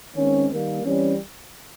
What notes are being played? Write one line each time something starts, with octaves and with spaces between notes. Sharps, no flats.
D#3 G#3 C4 C#4
D#3 G3 A#3
E3 G3 C4 C#4